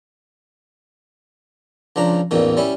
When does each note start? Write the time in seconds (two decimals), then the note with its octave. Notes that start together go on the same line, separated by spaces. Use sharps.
1.96 C#2 F3 D4 A#5
2.31 A1 E2 A#2 D#3
2.57 G3 C#4 E4